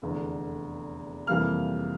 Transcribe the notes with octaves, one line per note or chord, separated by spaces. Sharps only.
F1 E2 D3
F2 C3 E3 G3 A#3 F5 F6